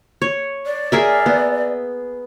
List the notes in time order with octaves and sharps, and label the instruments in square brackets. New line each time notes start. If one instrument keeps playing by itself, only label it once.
[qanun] C#5
[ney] D5
[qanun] G#4 A#4 E5
B3